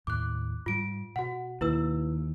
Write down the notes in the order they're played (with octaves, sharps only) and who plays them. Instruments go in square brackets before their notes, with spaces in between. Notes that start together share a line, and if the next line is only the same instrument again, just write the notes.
[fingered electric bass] D#2 A2 [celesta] D6 F#6
[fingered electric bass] G#2 G3 [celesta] F4 D7
[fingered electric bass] B2 [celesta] F#4 F#5
[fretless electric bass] D#2 [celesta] E4 B4 E6